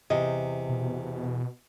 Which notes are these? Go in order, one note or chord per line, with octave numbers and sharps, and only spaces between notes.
E2 C3 D#5
B2